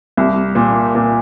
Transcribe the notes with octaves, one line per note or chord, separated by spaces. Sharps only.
C2
A#2
A#2